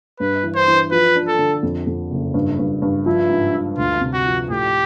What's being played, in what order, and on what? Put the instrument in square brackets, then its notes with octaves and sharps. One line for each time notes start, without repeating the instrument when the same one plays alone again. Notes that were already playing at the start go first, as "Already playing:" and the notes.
[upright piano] G2 [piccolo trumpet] B4
[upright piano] E3
[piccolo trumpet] C5
[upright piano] E3
[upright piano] F3 [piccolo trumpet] B4
[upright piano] D4
[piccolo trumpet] A4
[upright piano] D3
F2
F2
F#1
G2
G2
G2
[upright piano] F3 [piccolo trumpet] E4
[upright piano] G#2
G#2
[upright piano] D2 [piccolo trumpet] F4
[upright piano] C3
[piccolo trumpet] F#4
[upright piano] F3
[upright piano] A2 [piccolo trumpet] G4